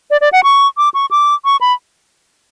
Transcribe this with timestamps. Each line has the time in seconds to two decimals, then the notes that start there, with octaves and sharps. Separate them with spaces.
0.11 D5
0.21 D5
0.32 F#5
0.44 C#6
0.77 D6
0.94 C#6
1.11 D6
1.45 C#6
1.61 B5